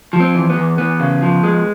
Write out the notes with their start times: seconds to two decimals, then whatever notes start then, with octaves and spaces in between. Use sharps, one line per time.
0.13 F3
0.20 C4
0.35 E2
0.50 B3
0.56 E2
0.78 E2 B3
1.00 C#3
1.22 F3
1.43 G#3